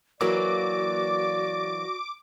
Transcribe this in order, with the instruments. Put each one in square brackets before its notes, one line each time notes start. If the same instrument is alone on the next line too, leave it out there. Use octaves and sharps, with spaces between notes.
[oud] E3 F#3 A#3 [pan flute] F#4 [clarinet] D5 [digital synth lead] D6